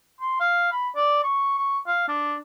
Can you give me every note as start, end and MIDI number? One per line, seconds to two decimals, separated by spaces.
0.21 0.37 84
0.40 0.72 77
0.72 0.88 83
0.95 1.21 74
1.24 1.57 85
1.58 1.78 85
1.87 2.05 77
2.08 2.36 62